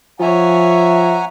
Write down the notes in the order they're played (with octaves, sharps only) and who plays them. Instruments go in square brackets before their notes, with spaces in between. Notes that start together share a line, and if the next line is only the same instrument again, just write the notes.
[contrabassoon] F3 [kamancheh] C#5 E5 [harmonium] F#5 G#5 A#5